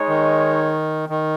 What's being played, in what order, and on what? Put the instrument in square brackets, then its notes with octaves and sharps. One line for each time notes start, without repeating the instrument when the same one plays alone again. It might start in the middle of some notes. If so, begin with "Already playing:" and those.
Already playing: [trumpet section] G#3 D#4 C#5
[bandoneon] D#3
D#3